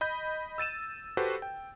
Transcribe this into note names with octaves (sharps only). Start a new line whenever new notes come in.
D#5 B5 G6
E6 A6 D#7 E7
F#4 G4 A4 B4 C5
G5